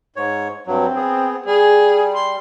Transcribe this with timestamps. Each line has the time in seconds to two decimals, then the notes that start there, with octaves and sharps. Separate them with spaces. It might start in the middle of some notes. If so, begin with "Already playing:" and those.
0.16 G#2 C#5
0.67 G2 F#3 C4
0.96 B3 G#4
1.46 G3 G#4
2.14 C6